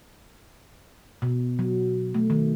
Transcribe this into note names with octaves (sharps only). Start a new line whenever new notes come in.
B2
F#3
A3
D#3